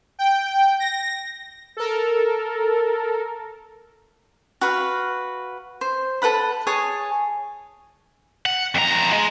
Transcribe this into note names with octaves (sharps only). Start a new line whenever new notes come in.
G5
A#6
A4 A#4
F#4 B4 F5
C5
A4 B4 F#5 B5
G#4 C#5 G#5 A5
F#5
F2 A#5
G#3